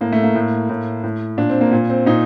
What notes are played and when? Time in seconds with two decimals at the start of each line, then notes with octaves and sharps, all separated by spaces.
0.01 A2 A#3
0.13 A3
0.24 A#3
0.35 A2
0.69 A2
1.04 A2
1.37 A#2 D4
1.50 C4
1.61 A#3
1.72 A#2
1.90 C4
2.06 A#2 D#4